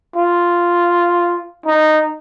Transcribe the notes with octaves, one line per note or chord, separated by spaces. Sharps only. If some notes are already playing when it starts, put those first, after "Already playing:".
F4
D#4